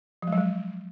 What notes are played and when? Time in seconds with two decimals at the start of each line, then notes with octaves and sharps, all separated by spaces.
0.22 F3
0.27 G#3
0.32 F#3
0.38 G#3